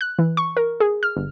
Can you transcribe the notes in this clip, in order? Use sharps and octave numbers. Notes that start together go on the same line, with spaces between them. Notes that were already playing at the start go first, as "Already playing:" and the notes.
F#6
E3
C#6
A#4
G#4
F6
G1